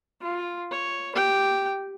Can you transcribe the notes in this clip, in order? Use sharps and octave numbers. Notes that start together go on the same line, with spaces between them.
F4
C#5
G4 G5